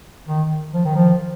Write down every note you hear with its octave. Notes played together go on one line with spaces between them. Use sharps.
D#3
F3
D#3
F3